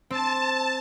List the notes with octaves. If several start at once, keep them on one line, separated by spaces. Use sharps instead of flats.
C4 A5